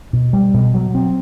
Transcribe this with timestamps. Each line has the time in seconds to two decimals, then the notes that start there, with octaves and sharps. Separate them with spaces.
0.13 B2
0.33 G3
0.54 B2
0.74 F#3
0.95 C4